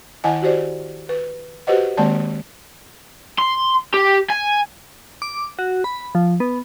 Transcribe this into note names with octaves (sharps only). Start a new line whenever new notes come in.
D#3 E4 D#5 F#5 G#5 A5
F#4 G4 C5 D5
B4
F#4 G4 B4 C5 D#5 F#5
D#3 G#3 A#3 C4 D5 A5
C6
G4
G#5
D6
F#4
B5
F3
B3